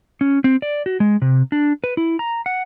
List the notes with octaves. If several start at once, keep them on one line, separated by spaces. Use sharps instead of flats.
C#4
C4
D5
F#4
G#3
C3
D4
B4
E4
A#5
F#5